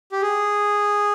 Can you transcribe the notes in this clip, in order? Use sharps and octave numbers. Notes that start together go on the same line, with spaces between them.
G4
G#4